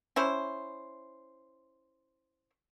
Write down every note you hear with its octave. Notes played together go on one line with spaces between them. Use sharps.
C#4 E4 C5